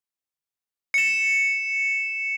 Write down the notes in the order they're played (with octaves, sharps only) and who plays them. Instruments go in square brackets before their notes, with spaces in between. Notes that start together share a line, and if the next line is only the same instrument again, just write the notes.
[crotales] C#7 E7